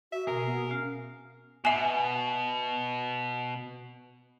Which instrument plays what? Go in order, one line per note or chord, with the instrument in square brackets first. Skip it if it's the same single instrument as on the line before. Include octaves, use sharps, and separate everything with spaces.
[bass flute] F#4 [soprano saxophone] E5
[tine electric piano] B2 [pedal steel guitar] G#4 [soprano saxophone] A#4
[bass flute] B3
[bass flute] C#4 [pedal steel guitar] F5
[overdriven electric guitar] B2 [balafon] E5 G#5